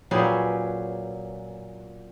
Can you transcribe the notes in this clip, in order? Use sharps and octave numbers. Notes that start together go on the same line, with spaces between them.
A#2 F#3 C#4 G4 G#4 B4